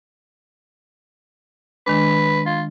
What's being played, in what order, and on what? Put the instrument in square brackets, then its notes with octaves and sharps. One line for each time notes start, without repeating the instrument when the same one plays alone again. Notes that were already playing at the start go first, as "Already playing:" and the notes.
[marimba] D#3 G#3 D4 [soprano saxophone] B4
[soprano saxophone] F4